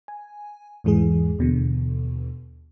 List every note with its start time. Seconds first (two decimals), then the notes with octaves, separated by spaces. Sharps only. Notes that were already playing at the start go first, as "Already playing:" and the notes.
0.08 G#5
0.84 E2 G#2 E3 G#3 G#4
1.39 D#2 B2 D3 E3